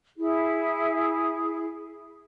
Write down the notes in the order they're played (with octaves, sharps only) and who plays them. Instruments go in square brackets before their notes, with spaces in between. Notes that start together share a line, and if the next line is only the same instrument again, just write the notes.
[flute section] E4 G#4